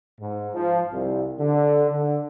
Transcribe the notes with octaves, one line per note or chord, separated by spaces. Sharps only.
G#2
F3
C2
D3
D3